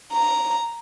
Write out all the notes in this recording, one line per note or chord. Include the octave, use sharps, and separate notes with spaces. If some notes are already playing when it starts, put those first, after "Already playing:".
A#5